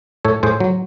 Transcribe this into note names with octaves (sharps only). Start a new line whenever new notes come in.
A2 A4 C#5
A2 G#4 C5
F#3